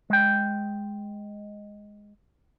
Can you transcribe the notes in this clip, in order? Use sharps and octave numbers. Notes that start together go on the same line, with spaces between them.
G#3 G5